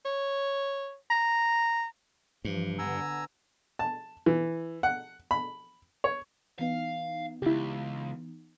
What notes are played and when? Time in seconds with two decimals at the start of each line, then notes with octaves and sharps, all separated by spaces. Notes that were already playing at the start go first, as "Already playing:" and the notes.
0.05 C#5
1.10 A#5
2.45 G2 E3 F3
2.79 D3 B3 G#5 A#5 E6
3.79 A5
4.26 E3
4.83 F#5
5.31 B5
6.04 C#5
6.59 E3 B3 D#4 F5
7.42 C#2 E4 G4